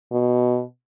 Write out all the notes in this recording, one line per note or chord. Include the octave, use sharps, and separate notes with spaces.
B2